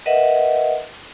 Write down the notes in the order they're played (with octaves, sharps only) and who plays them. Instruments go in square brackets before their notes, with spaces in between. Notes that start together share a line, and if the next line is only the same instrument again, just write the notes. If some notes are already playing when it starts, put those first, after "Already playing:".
[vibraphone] A#4 B4 D#5 E5 F#5